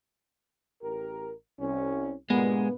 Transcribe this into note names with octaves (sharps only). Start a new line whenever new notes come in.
A1 G4 A#4
C2 C#4
G2 A#2 G#3 B3